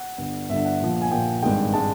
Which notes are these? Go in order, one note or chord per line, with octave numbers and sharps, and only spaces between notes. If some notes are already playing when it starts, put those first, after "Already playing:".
Already playing: F#5
G1 G2 D3
G1 G2 D3 E5
F#5
A#1 A#2 F3
G#5
A#1 A#2 F3 G5
G#1 G2 D#3 G#3 G5
D#3 G#3 A5